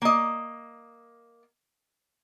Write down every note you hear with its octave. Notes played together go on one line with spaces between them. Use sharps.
A#3 D#5